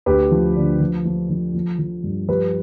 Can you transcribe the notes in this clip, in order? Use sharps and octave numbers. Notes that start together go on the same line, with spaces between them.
D2 G4 B4
F3
D3
F3
F3
F3
F3
F3
G2
F3 G4 B4